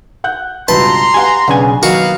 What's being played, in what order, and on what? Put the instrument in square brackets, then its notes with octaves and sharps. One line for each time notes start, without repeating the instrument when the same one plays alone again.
[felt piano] F#5 F#6 G6
[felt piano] C#2 G2 B2 [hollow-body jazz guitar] B4 [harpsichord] A5 [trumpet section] A#5 C6
[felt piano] G4 B4 F#5 [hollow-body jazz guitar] F5 G#5
[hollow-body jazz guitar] B1 C#3 G#5 [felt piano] D4 B4 F#5
[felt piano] D#3 F#3 [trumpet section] A#3 B3 F5 [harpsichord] F#4 [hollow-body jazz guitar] A#4